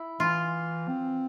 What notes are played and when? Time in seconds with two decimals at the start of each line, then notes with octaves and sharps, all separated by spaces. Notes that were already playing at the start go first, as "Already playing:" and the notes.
Already playing: E4
0.20 E3 F4
0.88 C4